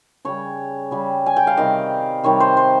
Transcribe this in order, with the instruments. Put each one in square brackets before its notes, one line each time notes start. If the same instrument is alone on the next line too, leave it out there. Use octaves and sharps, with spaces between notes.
[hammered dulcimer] C#3 G3 C#5
C#3 G3
G#5
G5
F5
C3 D#3 G3 D#5
C3 D#3 G3 C#5
C5
C5